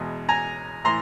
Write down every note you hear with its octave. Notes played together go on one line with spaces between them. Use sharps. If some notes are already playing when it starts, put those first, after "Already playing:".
Already playing: E2 B2 G#3
G#5 A#5
A2 E3 A#5 C6